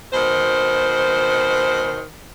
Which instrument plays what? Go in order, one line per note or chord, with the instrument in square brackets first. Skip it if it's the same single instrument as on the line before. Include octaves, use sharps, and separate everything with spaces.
[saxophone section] B2 D#3 C5